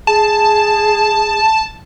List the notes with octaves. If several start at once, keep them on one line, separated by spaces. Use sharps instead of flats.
G#4 A5